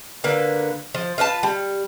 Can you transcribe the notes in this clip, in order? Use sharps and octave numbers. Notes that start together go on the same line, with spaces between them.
D3 A#3 B4
F3
F4 B4 D#5 A5
G3